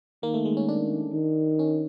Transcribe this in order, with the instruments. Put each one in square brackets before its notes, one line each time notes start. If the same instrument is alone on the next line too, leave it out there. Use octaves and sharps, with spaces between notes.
[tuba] D#3 [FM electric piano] A#3
[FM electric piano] A3
G#3
C#4
D4
[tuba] D#3
[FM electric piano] C#4